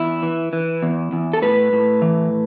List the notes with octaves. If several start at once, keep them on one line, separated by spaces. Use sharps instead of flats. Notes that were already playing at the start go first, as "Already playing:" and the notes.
Already playing: E2 E4
E3
E3
E2
E2
A4
A2 B4
A2
E3